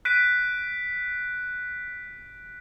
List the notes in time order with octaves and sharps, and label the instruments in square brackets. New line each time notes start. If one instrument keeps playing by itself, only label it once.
[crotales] F#6 B6 D7 D#7